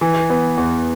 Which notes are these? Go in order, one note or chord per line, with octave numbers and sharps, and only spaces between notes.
E3
B3
E2